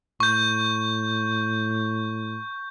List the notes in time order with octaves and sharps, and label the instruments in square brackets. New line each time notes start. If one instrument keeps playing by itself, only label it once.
[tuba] A2 [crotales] C#6 G6